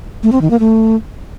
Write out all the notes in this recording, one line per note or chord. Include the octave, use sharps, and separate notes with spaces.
A3
C4
D#3
A#3
A3